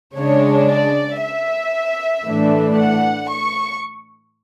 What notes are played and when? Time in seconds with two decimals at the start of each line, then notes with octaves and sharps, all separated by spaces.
0.15 C#3 G#3 D4 C#5
0.68 D5
1.20 E5
2.25 A2 E3 A3 D4
2.77 F#5
3.29 C#6